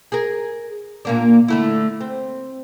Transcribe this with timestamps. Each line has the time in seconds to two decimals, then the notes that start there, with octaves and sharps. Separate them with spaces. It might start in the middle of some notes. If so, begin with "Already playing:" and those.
0.12 G#4 A#4
1.05 A#2 A#3 D4
1.48 D3 A3 E4
2.00 C4